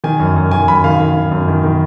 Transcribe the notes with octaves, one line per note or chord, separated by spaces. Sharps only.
D#3 G#5
F#2
F#2
D#3 G#5
F#2 B5
D#3 F5
D#3 F5
D#3
F#2
D#3
D#3